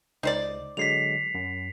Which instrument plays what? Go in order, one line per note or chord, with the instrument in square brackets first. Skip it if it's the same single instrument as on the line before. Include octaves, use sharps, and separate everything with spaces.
[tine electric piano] C#2 [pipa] D#4 C5 D5
[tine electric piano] D3 F#3 G#3 [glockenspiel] B6 C7 F7
[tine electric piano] F#2